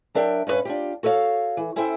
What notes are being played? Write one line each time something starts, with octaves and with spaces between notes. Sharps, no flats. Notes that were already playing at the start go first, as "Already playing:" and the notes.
F#3 D4 A#4 E5 G5
G2 C#4 D#4 B4 C#5
D4 F4 G4
F#4 A4 C#5 D#5 F5
E3
C#4 E4 A4 C5 E5 G5